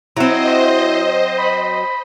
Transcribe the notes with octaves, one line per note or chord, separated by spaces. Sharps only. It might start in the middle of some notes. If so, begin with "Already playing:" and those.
F#3 C4 E4 C5 D#5
B5